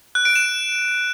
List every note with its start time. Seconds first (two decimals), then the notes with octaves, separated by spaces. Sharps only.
0.15 F#6
0.25 D7
0.35 E7